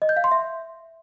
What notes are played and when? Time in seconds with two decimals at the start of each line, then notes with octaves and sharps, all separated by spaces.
0.02 D#5
0.09 G6
0.17 F5
0.24 C6
0.31 E5